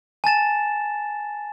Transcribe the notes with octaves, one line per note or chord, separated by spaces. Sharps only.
G#5 A5 A6 E7